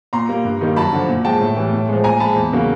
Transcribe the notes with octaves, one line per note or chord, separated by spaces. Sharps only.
A#2 A#5 C6
G3 A#3
G2
D#3 G3 A#3
F#2 A5 B5
D3 F3
A#2
F3 G#3 G5 A5
A2
E3 G3
A2
F3 G#3
A#2 G#5 A#5
F3 G#3 A5 B5
E2
C#3 F#3 A#3